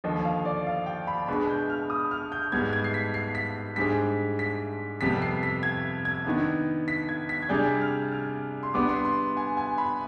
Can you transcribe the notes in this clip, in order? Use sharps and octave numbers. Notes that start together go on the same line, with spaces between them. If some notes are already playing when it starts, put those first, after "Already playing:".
D#2 D3 F3 D#5
F5
D5
F5
G5
B5
B2 G#3 D4 B5
G6
F6
D#6
F6
G6
G#2 G3 B3 G#6
G#6
C7
B6
C7
B6
G#2 G3 D4 G#4 C5 B6
B6
F2 C3 G3 B3 B6
C7
B6
G#6
G#6
D#3 B3 D4
B6
G#6
B6
G#6
C3 G3 D4 G#4 D5 G6
F6
F6
C6
G3 B3 D4 D6
C6
C6
G#5
G#5
B5